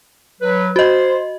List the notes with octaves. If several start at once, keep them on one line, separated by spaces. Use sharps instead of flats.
F#3 B4
F#4 C5 D#5